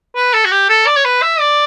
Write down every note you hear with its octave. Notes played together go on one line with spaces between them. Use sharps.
B4
A4
F#4
G4
A4
D5
C#5
B4
E5
D5